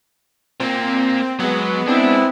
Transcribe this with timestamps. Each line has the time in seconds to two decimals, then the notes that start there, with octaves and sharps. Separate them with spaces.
0.60 A#2 A#3 C4
1.40 F#3 G#3 B3
1.88 C4 D4 E4